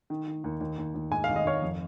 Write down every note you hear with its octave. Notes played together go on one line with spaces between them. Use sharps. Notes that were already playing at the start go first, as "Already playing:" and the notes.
D#3
D#3
D#2
D#2
D#2
D#2
G#2 G#5
G#1 F5
D#5
G#1 C#5 F5
F2